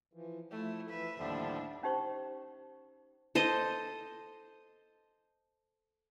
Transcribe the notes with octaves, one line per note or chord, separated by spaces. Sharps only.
E3 F3
F3 A3 E4
E3 F3 B4 E5
D#2 A2 D3 F3 G3 D4
C#4 D#4 G4 C5 C#6
A4 C5 D#5